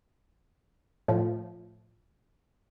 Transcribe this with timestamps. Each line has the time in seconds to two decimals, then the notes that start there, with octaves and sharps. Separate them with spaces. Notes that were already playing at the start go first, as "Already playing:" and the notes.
1.08 A2 F3